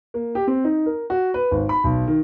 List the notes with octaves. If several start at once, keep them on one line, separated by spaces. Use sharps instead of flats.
A#3
G4
C4
D#4
A#4
F#4
B4
G#1
B5
B1
D#3